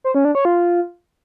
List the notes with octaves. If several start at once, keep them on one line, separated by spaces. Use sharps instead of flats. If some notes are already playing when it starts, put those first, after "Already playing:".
C5
C#4
D4
C#5
F4